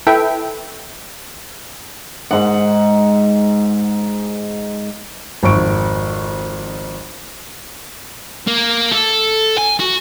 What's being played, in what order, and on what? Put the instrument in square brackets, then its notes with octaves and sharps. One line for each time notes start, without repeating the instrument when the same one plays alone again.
[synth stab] E4 A4 B4 E5 G5
[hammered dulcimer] G#2 F#5
[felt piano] G#1 F2 C#6 D7
[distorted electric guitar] A#3
A4
G#5
F#4